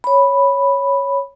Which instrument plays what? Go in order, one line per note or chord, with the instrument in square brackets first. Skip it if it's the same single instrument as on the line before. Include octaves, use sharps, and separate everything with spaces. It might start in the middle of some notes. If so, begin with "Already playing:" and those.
[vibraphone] C#5 B5